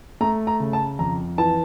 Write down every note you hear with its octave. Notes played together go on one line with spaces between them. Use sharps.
A3 A#5
A#5
C#3
A5
F2 A#5
E3 A5